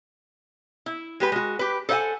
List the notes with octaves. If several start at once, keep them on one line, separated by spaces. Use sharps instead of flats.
E4
G#3 G4 B4
G#3 F#4
G4 B4
A4 C5 E5 F#5 G#5